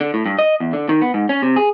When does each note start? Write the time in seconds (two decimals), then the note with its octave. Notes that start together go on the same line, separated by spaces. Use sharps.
0.01 D3
0.14 A2
0.26 G2
0.39 D#5
0.60 E2
0.73 D3
0.89 D#3
1.01 B3
1.14 G#2
1.29 C#4
1.42 C3
1.56 G#4